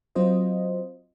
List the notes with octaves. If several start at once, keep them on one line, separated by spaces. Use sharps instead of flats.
F#3 C4 F4 C5 D#5